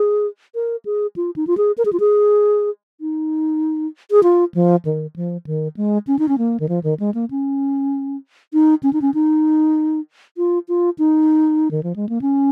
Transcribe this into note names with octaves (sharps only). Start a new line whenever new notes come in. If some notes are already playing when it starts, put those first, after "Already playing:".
Already playing: G#4
A#4
G#4
F4
D#4
F4
G#4
A#4
G#4
F4
G#4
D#4
G#4
F4
F3
D#3
F3
D#3
G#3
C#4
D#4
C#4
A#3
D#3
F3
D#3
G#3
A#3
C#4
D#4
C#4
D#4
C#4
D#4
F4
F4
D#4
D#3
F3
G#3
A#3
C#4